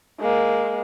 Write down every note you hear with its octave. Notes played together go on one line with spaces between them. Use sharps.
G#3 A#3